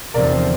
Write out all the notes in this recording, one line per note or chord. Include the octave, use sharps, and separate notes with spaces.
F1 E2 D3 F3 C4 A#4 D5